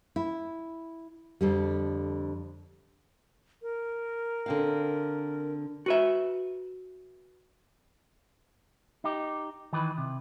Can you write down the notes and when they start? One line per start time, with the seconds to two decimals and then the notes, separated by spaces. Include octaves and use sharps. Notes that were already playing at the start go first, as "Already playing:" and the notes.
0.16 E4
1.41 F2 D3 G3
3.62 A#4
4.46 D3 C4 F5
5.86 F#4 B4 E5
9.04 D#4 G4
9.73 D#3 E3 B4
9.98 C3